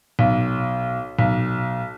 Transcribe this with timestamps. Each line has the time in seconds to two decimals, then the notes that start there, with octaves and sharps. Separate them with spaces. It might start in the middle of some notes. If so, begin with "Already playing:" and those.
0.19 B1
1.19 B1